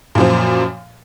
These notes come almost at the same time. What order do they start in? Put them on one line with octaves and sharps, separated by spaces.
A#2 F#2 F3